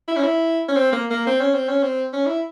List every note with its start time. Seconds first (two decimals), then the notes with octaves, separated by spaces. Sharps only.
0.08 E4
0.16 C#4
0.23 E4
0.68 C#4
0.76 C4
0.92 A#3
1.10 A#3
1.27 C4
1.40 C#4
1.54 C4
1.68 C#4
1.83 C4
2.13 C#4
2.26 E4